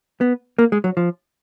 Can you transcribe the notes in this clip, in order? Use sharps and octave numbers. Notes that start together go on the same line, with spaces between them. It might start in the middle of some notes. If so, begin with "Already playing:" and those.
B3
A#3
G#3
F#3
F3